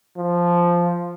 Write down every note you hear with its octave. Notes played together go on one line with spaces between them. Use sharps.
F3